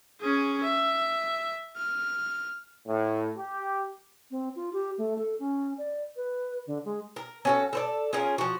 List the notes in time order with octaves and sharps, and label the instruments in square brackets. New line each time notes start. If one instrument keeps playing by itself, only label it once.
[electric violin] C#4 G#4
E5
F6
[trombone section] A2
G4
[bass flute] C4
F4
G4
A3
A4
C#4
D5
B4
D3
G#3
[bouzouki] A#4
C#4 F#4 A4
A4 C5 D5
C#4 F4 G#4 A#4
F3 F#4